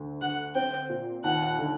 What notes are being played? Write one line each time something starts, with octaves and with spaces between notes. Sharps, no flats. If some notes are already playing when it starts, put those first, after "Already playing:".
Already playing: D2
D3 F#5
C4 G5
A#2
D#2 F#5
D3